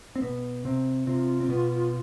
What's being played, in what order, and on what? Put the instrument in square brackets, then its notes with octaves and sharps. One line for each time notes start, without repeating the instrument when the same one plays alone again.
[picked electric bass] C4
B2 B3
C3 C4
[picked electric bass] C3 C4 [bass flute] F4
[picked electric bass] C4
B2 B3